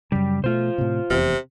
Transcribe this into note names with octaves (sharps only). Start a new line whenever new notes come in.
F#2 C#3 G3
B2 G#3 A3 F4 C5
A2 C3
F1 E2 C3